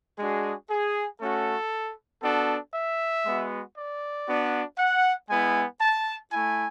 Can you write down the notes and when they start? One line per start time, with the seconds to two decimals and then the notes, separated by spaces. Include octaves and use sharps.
0.19 G#3 D4 F#4 G#4
0.70 G#4
1.21 A3 C#4 F#4 A4
2.23 B3 D4 F#4 A4
2.74 E5
3.26 G#3 B3 F#4
3.77 D5
4.28 B3 D4 F#4
4.78 F#5
5.29 G#3 B3 E4 G#5
5.81 A5
6.32 A3 E4 G#5